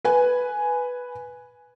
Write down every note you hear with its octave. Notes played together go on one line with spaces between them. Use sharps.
B4 G#5